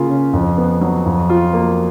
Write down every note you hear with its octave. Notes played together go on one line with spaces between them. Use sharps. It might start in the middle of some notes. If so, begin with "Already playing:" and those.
Already playing: C#3 A#3 F4
C#4
F2
B3
F#3
F2
F4
A#3